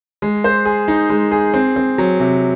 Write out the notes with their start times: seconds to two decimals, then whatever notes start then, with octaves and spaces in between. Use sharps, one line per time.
0.22 G#3
0.44 C5
0.65 G#4
0.88 D#4
1.10 G#3
1.32 G#4
1.54 C4
1.76 C4
1.98 F#3
2.20 C3